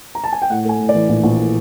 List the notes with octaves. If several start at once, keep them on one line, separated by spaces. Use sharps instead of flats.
A#5
A5
G#5
G5
A2 F#5
A3 G#5
A2
D5
E3
A#1
A#1
A2